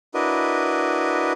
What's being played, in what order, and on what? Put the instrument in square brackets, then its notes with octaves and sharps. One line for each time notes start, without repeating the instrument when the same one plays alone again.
[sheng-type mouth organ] D4 E4 F#4 A#4 B4 D#5